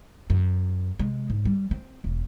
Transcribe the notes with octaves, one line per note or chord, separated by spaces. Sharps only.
F#2
C3 G#3
G#2
G3
C4
E1